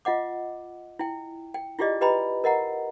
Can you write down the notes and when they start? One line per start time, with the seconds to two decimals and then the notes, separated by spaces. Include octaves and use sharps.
0.05 F4 D#5 F#5 D6
0.99 E4 G5
1.54 G5
1.79 E4 F4 G4 G#4 D5 D#5
2.01 G4 B4 D#5 G5 A#5 B5
2.44 A#4 D#5 F#5 A#5